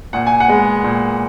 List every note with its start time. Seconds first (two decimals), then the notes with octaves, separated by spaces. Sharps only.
0.13 A#2 F#5
0.27 G#5
0.40 F#5
0.48 G#3 B3
0.84 A#2